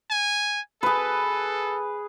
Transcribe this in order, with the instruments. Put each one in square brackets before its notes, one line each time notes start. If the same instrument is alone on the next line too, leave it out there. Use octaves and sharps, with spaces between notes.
[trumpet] G#5
[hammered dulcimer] G#4 B4 [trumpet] A4